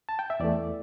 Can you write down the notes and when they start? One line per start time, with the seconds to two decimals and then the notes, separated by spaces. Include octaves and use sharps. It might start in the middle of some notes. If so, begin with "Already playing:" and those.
0.09 A5
0.19 G5
0.30 E5
0.40 E2 E3 A3 D5